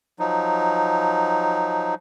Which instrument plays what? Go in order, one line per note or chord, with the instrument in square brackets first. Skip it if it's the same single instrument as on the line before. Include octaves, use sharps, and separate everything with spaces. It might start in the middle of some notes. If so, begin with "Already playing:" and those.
[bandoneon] F3 F#3 D#4